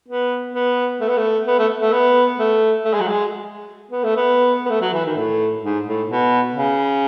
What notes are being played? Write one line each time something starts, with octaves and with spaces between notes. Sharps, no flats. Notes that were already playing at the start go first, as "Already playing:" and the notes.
B3
B3
A3
B3
A3
B3
A3
A3
B3
A3
A3
G#3
F#3
G#3
B3
A3
B3
B3
A3
F#3
E3
D#3
A2
G#2
A2
B2
C#3